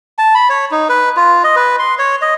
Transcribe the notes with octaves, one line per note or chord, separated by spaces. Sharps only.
A5
B5
C#5
D#4
B4
F4
D#5
B4
C6
C#5
D#5